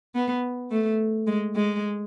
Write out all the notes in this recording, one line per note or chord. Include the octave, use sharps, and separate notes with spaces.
B3
A3
G#3
G#3